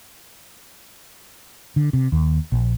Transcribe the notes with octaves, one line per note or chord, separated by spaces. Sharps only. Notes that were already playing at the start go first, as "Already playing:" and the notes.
D3
C3
D#2
A#1